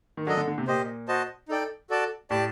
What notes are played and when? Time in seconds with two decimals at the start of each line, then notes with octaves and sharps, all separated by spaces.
0.17 D#3
0.27 F#3 D4 A4 D#5
0.37 D3
0.47 D3
0.58 C3
0.67 A#2 G4 C5 D#5
1.08 F#4 C5 D#5 A5
1.48 D#4 A4 D5 G5
1.90 F#4 A4 D5 A5
2.30 A2 G4 D5 A5